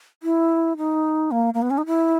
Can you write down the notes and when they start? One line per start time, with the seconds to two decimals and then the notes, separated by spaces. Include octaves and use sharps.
0.23 E4
0.77 D#4
1.31 A#3
1.54 A#3
1.62 B3
1.70 C#4
1.78 D#4
1.86 E4